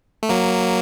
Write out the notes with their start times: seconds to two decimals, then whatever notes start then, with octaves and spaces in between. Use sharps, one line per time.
0.23 A3
0.29 F#3 A#3